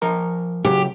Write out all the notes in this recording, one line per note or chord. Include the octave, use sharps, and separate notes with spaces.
F3 A#4 A#5
C#3 F#3 G4